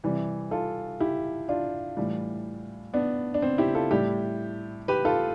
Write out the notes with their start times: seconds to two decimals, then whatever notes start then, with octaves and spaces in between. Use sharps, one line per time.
0.04 C3 E3 G3
0.51 F4 A4
1.00 E4 G4
1.49 D4 F4
1.97 A2 E3 G3
2.94 B3 D4
3.34 D4
3.42 C4
3.58 E4 G4
3.75 F4 A4
3.91 A2 G3 E4 G4
4.88 G4 B4
5.05 F4 A4